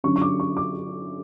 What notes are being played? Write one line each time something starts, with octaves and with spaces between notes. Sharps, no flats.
D3 F#3 C#4 C#6
C#6
D6
C#6
D6